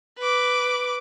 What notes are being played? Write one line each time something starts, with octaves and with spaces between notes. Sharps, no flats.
B4 D6